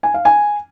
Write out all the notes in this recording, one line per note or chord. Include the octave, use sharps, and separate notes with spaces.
G#5
F5
G#5